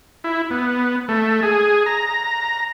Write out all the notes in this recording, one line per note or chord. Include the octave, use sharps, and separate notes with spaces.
E4
B3
A3
G#4
A#5